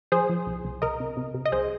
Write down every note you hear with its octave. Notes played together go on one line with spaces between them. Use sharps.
F3 G#4 C5
F3
C2
C2
C2 A#4 D#5
C3
C3
C3
D#5
C2 G#4 C5